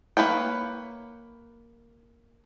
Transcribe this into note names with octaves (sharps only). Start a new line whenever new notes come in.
A#3 F#4 B4 C#5 G5